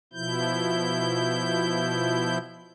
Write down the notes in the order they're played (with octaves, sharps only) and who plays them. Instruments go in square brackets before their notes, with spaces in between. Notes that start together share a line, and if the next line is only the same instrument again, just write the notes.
[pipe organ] B2 F3 E4 G6